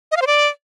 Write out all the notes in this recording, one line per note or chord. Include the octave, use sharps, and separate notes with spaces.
D#5
F5
C5
D5